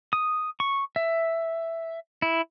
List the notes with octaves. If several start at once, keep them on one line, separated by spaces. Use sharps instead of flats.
D#6
C#6
E5
E4